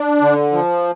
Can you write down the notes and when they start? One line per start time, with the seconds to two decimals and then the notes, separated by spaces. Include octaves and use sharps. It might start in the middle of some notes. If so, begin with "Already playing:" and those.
Already playing: D4
0.21 D3
0.52 F3